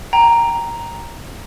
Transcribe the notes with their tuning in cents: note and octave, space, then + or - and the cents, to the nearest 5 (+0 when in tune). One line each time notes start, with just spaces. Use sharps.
G5 +0 A#5 +0